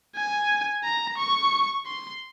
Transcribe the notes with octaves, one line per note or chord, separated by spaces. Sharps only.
G#5
A#5
C#6
C6